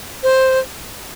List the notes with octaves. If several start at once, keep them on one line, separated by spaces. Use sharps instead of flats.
C5